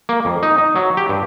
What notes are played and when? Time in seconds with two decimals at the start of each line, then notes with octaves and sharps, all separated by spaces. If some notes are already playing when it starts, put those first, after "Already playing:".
0.09 A#3
0.25 F2
0.43 D#4
0.58 D#4
0.76 F#3
0.97 G4
1.09 G2